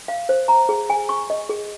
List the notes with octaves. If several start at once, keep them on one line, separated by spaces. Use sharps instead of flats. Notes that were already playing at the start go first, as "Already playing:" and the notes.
F5
C5
A#5
G#4
G#5
C#6
D#5
G#4